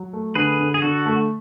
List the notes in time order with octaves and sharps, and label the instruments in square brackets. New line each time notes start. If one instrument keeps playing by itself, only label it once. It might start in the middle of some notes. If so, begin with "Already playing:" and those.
Already playing: [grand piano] F#3
A3
[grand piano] D3 [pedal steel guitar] G#4 B4
[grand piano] D3
[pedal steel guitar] G#4
[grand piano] D3 [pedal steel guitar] F#4 A4
[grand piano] A3